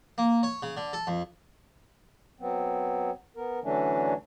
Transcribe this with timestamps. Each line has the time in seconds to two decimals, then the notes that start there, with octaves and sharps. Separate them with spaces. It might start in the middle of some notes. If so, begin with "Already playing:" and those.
0.18 A#3
0.43 C#5
0.63 C#3
0.77 D3
0.93 A4
1.07 F2
2.40 F#3 B3 C4
3.37 B3 A#4
3.63 D3 E3 F#3 A3 C#4 D4